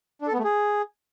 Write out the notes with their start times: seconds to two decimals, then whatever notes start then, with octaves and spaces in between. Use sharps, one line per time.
0.22 D4
0.27 A4
0.33 B3
0.39 A3
0.44 G#4